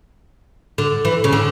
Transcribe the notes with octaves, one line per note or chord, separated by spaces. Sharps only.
D3
E3
C#3
D3